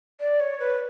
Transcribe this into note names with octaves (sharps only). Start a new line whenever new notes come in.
D5
C#5
B4